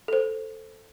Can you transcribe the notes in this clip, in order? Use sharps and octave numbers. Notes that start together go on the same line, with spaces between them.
A4 C5